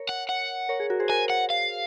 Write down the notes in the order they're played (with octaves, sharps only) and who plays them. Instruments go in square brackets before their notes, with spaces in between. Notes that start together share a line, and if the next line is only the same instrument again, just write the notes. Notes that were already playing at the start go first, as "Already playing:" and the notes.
Already playing: [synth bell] A#4 C#5
[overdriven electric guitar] F#5
F#5
[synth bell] A#4 C#5
G#4
F#4 A#4
G#4 C5
[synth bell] F#4 A#4 [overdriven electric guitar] G#5
[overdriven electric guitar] F#5
F5